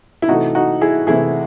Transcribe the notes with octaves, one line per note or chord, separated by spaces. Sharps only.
E4
C3 E3 A3 D#4 F#4
D#4 F#4
E4 G#4
C3 E3 A3 E4 G#4